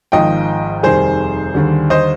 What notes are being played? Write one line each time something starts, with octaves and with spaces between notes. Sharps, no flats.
G#1 G#2 F3 D#5 G5
F1 D#2 D#3 G3 G#4 C5
D#2 D3 G3
C5 D#5